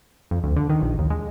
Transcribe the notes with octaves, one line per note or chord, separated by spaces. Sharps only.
F2
D2
D3
D#3
A#1
D#2
G#3